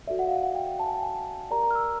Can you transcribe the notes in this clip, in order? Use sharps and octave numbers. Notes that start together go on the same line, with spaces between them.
F#4 A4 D5 E5
F#5
F5
F#5
F#5
G5
G5
A5
G#5
G5
G#5
G4 A#4 D5 A#5
A#5
F6
E6